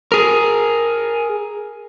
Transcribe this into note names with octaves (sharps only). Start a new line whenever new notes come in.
G#4 A#4